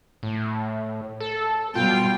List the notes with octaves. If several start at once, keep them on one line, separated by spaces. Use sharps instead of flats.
A2
A4
B2 G3 F4 G5